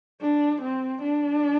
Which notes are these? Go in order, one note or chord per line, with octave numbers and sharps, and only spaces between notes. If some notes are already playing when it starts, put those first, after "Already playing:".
D4
C4
D4